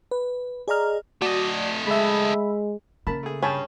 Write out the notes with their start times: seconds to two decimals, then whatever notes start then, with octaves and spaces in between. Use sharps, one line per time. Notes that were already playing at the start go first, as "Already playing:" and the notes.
0.11 B4
0.68 G#4 D5 D#5 A#5 F6
1.22 A3 F#4 D5 D#5
1.87 G#3 E5 B5
3.07 C#3 A#3 A#4 A5 B5
3.23 A3 G#4
3.43 G2 C#4 G#4 G5 A5 B5